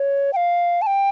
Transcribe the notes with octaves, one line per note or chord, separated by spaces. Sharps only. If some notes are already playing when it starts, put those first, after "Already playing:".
Already playing: C#5
G5
F5
A5
G5